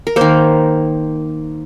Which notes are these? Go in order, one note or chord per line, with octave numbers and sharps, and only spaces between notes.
A#4
D#3 A#3 C5